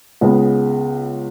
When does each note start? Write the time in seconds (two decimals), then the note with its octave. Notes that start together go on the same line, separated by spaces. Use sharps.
0.21 C#2 C#3 G#3 B3